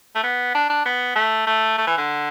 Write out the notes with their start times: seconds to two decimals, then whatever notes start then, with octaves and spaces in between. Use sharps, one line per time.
0.15 A3
0.23 B3
0.55 D4
0.70 D4
0.85 B3
1.15 A3
1.47 A3
1.78 A3
1.87 E3
1.97 D3